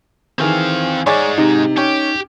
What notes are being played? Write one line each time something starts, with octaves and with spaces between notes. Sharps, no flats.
D#3 E3 C4 G#4 F5
G#2 G#3 G#4 C#5 D5
C3 D#4
C#4 G4